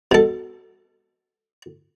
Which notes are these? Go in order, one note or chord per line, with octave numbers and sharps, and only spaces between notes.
B2 A4